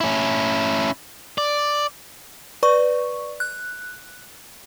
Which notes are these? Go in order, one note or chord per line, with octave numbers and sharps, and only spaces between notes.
C#4 E4
D5
B4 D5 C#6
F#6